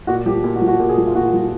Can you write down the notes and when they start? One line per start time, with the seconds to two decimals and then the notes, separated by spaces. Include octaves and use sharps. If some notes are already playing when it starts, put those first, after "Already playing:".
0.07 A#2 F#4
0.26 F3 G4
0.44 A#2
0.56 F#4
0.61 F3
0.68 F#4
0.79 A#2 G4
0.89 G#4
0.98 F3
1.07 F4
1.15 A#2 F#4
1.33 F3